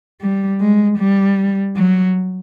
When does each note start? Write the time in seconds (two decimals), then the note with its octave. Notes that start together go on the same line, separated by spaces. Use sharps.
0.21 G3
0.60 G#3
0.98 G3
1.76 F#3